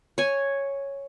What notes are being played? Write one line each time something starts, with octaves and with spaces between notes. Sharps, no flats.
C#5 G#5